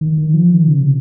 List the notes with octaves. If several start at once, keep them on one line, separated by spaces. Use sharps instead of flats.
D#3
D#3
F3
D#3
C#3
C3